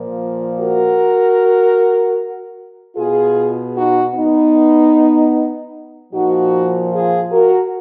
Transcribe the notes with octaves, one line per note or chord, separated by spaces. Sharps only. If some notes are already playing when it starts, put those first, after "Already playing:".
Already playing: A#2 F3
F#4 A#4
B2 F4 G#4
D#4 F#4
B3 D#4
A#2 F3 D#4 F#4
F4 G#4
F#4 A#4